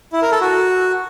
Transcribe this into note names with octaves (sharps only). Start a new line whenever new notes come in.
E4
A#4
A4
F#4